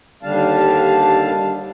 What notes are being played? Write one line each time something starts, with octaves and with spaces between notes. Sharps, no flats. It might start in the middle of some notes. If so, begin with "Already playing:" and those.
D#2 D3 G3 D4 F5 A5